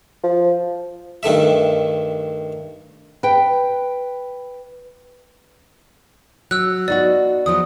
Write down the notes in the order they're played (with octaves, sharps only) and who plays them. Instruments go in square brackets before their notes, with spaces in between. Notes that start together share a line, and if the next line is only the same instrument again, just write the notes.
[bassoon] F3
[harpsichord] G2 D#3 A3 E5
[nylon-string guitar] B4 G5
[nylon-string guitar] F#3 [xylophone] E6 F#6
[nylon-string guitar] B3 D#4 F#4 [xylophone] D5
[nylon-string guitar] E2 F3 F#3 [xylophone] D#6